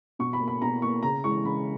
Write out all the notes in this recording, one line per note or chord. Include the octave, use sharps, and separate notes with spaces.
B2 C#6
B5
A#3
B5
B2 A#5
A#3 C#6
C#3 A#5
E3 G#3 C#6
C#3 B5